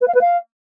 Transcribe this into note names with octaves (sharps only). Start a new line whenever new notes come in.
B4
F5
B4
F5